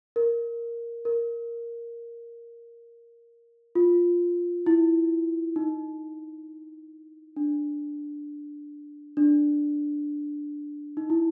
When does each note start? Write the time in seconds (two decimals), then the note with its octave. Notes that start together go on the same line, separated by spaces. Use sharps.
0.16 A#4
1.05 A#4
3.75 F4
4.66 E4
5.56 D#4
7.36 D4
9.17 D4
10.97 D#4
11.10 E4